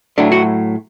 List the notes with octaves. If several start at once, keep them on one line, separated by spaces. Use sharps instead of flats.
A2 F#3 A3 D4
F#4